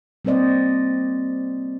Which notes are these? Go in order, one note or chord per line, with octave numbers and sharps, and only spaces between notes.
G3 A#3 C4 C5 D5 D#5